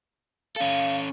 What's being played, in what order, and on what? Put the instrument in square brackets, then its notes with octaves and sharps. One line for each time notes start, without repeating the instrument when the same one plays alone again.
[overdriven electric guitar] C#4 A4 [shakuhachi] F5